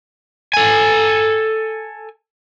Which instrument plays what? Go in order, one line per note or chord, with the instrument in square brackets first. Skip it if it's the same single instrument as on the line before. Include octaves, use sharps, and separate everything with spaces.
[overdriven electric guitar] A4 G#5